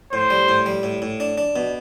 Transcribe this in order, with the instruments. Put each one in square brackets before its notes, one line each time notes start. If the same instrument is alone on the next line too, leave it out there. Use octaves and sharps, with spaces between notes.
[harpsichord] A2 [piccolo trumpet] C5
[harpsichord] G3
A2
G3
A2
A2
D4
D4
B2